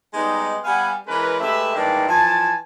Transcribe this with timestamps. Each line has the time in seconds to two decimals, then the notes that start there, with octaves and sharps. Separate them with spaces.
0.14 G3 G#3 B3 D#4
0.64 G3 B3 F5 F#5 G#5
1.06 E3 G#3 C#4 A#4 B4
1.40 G#3 A3 G4 B4 E5
1.74 G#2 D#3 E3 G3 A#3 D4
2.08 E3 F3 G#5 A5